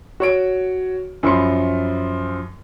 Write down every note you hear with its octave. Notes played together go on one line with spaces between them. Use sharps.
F#4 C#5 D7
F#2 F3 B5 C6 C#7